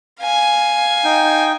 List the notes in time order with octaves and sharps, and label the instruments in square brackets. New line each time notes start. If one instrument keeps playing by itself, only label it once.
[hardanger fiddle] F5 G#5
[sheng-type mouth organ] D#4 G5